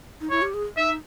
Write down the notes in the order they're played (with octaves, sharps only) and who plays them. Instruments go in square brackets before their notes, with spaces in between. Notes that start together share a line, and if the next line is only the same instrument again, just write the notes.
[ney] D#4
[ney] E4 [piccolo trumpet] C#5
[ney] G4
G#4
[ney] D#4 [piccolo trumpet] E5